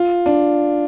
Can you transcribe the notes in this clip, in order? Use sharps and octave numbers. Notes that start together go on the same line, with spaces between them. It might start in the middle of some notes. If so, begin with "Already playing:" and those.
Already playing: F4
D4